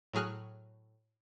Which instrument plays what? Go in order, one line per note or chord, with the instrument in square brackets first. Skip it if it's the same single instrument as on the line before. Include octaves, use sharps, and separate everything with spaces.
[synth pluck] A2 F#3 G#4 F6 F#6